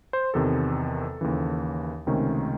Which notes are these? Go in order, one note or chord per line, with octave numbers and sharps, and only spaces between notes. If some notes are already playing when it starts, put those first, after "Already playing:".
C5
E2 C3 D#3 A4
D#2 C#3 E3
C#2 C3 D#3 A3 C#4